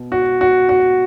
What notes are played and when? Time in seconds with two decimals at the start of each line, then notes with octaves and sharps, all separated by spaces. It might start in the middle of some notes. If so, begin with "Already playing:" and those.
Already playing: B2
0.12 F#4
0.41 F#4
0.69 F#4